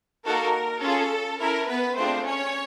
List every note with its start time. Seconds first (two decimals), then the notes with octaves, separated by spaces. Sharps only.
0.24 A#3 D#4 F#4 A4 A#4
0.81 C#4 F4 G#4 A4
1.39 C#4 E4 A4 A#4
1.67 B3 B4
1.96 A3 C4 D4 F4 G#4 C5
2.25 C#4 C#5